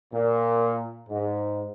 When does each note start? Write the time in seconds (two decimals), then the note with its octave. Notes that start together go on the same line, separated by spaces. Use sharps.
0.14 A#2
1.09 G#2